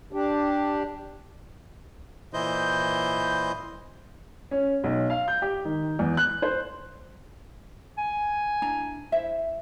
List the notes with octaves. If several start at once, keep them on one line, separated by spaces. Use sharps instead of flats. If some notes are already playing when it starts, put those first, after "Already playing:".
D4 G4
A#2 E3 E4 C5 D#5 G6
C#4
B1
F5
G6
G4
D#3
E2
F#6
C5
G#5
D4 E4 A#5
E4 C5 E5